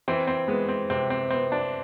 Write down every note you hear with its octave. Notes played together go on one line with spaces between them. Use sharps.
E3 C4
C4
G#3 B3
C4
C3 C4
C4
B3 C4
D4